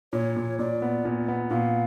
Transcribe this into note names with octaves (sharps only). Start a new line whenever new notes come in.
A#2 C#5
A#2
A#2 D5
B3
A#2
B3
A#2 F5